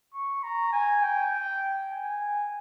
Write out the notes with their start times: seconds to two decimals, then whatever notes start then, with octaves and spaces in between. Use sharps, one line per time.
0.14 C#6
0.43 A#5
0.73 G#5
1.03 G5
1.91 G#5